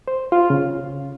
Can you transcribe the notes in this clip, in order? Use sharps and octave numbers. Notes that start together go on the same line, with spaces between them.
C5
F4
C#3